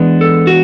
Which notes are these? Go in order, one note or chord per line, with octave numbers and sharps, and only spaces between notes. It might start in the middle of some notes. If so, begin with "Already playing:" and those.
Already playing: E3 G#3 B3 D4
A4
F#4